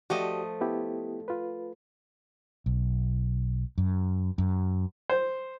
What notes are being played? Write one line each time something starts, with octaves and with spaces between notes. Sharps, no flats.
F3 A3 F#4 G4 D5 D#5
B3 E4 G4
F4 B4
B1
F#2
F#2
C5